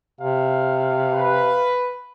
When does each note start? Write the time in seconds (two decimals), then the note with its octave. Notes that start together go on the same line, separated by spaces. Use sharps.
0.21 C3 F5
1.13 B4